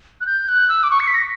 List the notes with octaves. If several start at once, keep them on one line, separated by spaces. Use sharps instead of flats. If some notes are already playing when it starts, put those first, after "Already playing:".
F#6
G6
F#6
E6
D6
C#6
C#7
B6
A#6